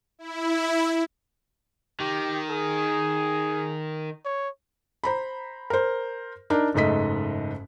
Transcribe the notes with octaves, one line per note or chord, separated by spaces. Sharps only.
E4
D#3 G4
G#4
C#5
C5 A#5 B5
A#4 C5
D4 D#4 A#4
F#1 G#2 A3 D#5 B6